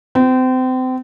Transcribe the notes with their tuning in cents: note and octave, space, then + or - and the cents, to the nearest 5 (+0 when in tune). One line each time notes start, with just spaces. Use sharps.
C4 -30